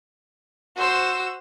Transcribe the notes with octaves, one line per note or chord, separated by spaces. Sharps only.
F#4 C5 E6